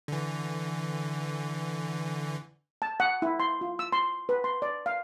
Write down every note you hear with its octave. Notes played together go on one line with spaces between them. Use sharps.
D3 E3
A5
F#5
E4
C6
F4
E6
C6
B4
C6
D5
F5